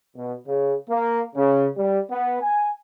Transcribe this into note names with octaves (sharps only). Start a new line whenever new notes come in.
B2
C#3
A#3
C#3
G3
B3
G#5